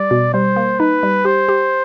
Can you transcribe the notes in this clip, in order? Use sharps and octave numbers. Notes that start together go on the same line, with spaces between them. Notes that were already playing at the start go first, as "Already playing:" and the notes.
Already playing: G3 D5
B2
G3 C5
A#3
D#4 B4
G3
G4 C5
G4